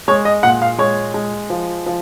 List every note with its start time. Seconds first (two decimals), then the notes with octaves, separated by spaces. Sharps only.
0.08 G#3 C#5
0.25 D#5
0.43 A#2 F#5
0.62 F5
0.78 G#3 C#5
1.14 G#3
1.50 F3
1.86 F3